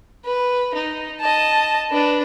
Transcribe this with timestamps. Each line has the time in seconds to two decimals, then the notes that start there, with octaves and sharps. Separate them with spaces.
0.25 B4
0.75 D#4
1.21 D#5 A5
1.91 D4 B4